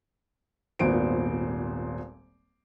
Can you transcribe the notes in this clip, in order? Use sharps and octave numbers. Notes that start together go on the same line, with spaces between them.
D#1 G#1 A#2 B3 C5 D7